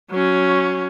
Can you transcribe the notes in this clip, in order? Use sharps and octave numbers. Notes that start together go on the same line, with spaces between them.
F#3 C#4